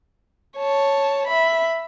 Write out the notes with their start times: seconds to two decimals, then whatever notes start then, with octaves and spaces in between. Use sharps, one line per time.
0.56 C#5 A5
1.27 E5 B5